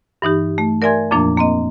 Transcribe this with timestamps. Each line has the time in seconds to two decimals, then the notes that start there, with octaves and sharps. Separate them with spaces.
0.22 G2 E3 D#4 G4
0.58 A3
0.82 A#4 D5 E5 G#5 C6 G#6
1.11 F2 A#2 F3 A#3 D4
1.38 A#3 C4 D#5